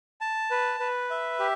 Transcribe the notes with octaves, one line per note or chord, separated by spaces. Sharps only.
A5
B4
B4
E5
G4